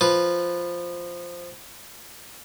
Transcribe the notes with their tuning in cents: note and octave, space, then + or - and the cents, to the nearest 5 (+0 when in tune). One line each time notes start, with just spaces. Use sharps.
F3 +0 B4 +0